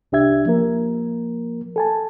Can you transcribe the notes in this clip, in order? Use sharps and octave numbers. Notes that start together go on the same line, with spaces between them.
C2 D4 G4 E5 G#6
F3 A#3 A#4
A4 G#5 A5